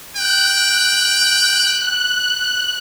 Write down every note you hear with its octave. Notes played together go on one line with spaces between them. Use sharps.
G5 F#6